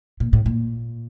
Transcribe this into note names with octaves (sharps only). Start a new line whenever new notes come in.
A#2
A2
A#2